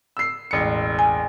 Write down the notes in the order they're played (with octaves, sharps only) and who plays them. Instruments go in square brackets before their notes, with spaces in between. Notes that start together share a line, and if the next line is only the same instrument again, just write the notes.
[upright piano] E6 C7
E1 A1 C#7
[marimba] G#5